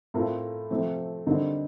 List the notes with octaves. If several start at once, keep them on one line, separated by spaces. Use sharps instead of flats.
A2 A3 C4 F4 A#4
C3 F3 A3 C4
D3 G3 C4 D#4 A#4